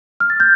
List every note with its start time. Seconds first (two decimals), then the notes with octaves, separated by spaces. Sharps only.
0.20 F6
0.30 A6
0.40 G6